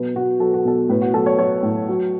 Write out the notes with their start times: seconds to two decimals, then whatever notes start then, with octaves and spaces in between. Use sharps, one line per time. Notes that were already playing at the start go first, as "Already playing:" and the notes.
Already playing: B2 F#3 B4
0.15 B2 F#4
0.40 F#3 A4
0.54 F#4
0.65 B2 A4
0.89 A2 B4
1.02 F#4
1.14 F#3 A4
1.26 C#5
1.39 F#3 C#5
1.63 A2
1.88 F#3